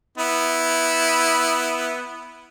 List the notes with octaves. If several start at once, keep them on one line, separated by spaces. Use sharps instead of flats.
B3 E4